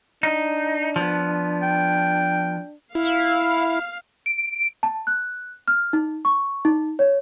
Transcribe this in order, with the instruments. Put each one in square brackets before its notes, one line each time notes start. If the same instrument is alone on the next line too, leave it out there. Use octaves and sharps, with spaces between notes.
[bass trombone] D4 [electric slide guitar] D#4
[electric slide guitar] F3 B3
[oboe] G5
[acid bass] E4 [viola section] F5
[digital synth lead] D7
[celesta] A5
F#6
F6
D#4
C#6
D#4
C#5